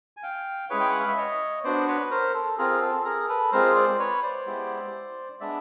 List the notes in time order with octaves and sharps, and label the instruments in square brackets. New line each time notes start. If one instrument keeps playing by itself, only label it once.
[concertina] G#5
F5 G5
G#3 C#4 E4 G#4 B4 C#5
G5
F#5
F5
E5
C#5 D#5
B3 D4 F#4 C5 D5
B4 C#5
A#4 C5
A4
C4 F4 G#4 A#4
A4
G#4 A#4
A4 B4
G#3 C4 F4 G#4 A#4 C5
C5 D5
B4 C#5
C5 D5
G#3 B3 E4 G4
G#3 B3 D4 D5 E5